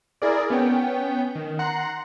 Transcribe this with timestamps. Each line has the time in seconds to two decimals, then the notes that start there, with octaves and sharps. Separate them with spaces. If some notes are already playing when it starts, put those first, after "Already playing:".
0.22 E4 G#4 A#4 D5
0.50 B3 C#4 G5
1.35 D#3
1.59 F#5 A#5 C6 F#6